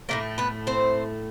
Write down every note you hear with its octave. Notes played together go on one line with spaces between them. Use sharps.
A2 E3 A3 A#3 A#4
B3 B4
C4 C5